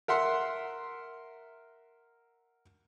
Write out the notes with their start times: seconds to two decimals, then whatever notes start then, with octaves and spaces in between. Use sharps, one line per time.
0.08 A#4 E5 F#5 C6